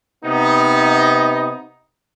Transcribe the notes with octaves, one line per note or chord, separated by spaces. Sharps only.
C3 B3 D#4